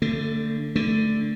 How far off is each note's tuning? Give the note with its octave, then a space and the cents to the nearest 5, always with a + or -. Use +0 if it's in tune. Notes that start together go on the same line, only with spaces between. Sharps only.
D3 +0 A3 +35
D3 +0 A3 -5